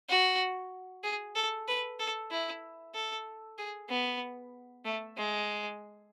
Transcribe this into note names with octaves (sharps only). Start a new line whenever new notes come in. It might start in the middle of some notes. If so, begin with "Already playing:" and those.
F#4
G#4
A4
B4
A4
E4
A4
G#4
B3
A3
G#3